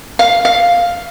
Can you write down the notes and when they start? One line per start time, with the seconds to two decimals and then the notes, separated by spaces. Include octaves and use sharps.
0.19 F5
0.45 F5